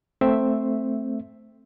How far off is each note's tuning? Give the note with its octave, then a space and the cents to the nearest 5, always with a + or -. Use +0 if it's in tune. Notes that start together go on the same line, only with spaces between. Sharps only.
A3 +0 C4 +0 E5 +0